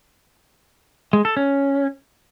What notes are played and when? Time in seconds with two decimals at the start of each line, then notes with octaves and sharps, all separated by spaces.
1.13 G#3
1.25 A4
1.37 C#4